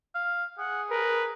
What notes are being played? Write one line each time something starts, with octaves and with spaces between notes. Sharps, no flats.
F5
G#4 F#5
A#4 B4